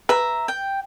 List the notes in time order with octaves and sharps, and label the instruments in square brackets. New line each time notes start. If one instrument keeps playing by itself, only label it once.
[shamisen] B4 [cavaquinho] E5 A#5
[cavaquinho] G5